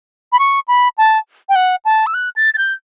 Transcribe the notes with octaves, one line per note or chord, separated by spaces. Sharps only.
B5
C#6
B5
A5
G5
F#5
A5
E6
F#6
A6
A6
G6